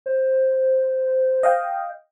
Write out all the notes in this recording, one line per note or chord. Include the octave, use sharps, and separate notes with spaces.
C5
D#5 F5 G5